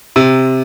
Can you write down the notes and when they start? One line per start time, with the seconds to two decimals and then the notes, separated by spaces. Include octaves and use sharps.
0.16 C3